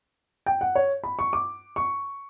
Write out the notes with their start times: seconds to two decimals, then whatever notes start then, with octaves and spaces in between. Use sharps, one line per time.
0.46 G5
0.61 F#5
0.75 C#5
1.04 B5
1.19 C#6
1.33 D6
1.76 C#6